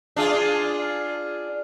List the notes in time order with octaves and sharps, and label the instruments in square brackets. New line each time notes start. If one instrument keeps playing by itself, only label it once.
[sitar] D4 F4 G#4